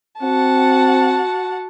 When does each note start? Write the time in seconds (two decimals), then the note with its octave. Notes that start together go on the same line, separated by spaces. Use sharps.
0.22 C4 F#4 F#5 A5